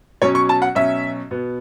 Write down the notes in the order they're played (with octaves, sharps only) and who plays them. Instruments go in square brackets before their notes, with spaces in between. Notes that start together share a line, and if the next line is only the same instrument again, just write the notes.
[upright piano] B2 F#3 C#4 C#5
C#6
A5
F#5
B2 F#3 C#4 E5
B2 B3